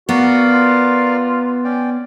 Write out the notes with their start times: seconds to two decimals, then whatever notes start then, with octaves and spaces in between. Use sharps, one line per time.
0.09 B3 F#4 A#4 D5 F5
0.53 F4
1.64 C#4 D5 G5